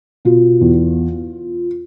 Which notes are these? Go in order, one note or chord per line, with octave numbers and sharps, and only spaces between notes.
B2 F4
E2